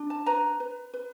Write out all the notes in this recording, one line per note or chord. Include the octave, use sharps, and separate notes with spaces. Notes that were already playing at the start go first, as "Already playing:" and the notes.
Already playing: D4
A5
B4 A#5
B4
B4